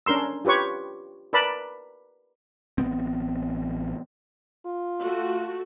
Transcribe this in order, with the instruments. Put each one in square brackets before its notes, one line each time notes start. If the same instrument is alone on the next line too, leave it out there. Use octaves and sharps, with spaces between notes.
[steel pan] C#4 D4 A#4 C6 E6
F4 G4 B4 C#5 C#6
A#4 B4 D5 A5 B5
[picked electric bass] A1 F#3 B3 C4
[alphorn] F4
[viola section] A3 F#4